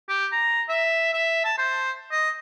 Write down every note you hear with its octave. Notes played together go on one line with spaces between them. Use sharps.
G4
A#5
E5
E5
A5
C5
D#5